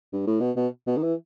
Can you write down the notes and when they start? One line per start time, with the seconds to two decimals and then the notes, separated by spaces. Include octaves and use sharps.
0.13 G2
0.27 A2
0.40 B2
0.56 B2
0.87 B2
0.97 D#3
1.03 E3